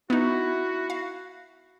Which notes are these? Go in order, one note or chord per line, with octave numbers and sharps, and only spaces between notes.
B3 D#4 E4 F#4
F5